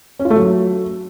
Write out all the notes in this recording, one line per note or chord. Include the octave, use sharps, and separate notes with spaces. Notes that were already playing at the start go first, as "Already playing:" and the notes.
C#4
F4
A3
F#3